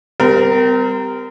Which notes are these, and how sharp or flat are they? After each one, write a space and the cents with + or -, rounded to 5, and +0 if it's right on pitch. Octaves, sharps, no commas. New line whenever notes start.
G3 +0 C4 -40 A#4 -10